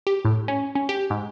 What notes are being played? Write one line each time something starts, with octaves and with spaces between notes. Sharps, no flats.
G4
A2
C#4
C#4
G4
G#2